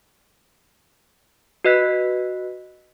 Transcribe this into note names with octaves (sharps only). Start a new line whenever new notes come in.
F#4 B4 D#5 F#6 B6